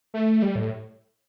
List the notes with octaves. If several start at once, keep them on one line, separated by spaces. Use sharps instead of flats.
A3
G3
A2